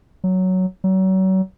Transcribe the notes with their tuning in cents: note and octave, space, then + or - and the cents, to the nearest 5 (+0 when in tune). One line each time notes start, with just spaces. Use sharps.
F#3 +5
F#3 +35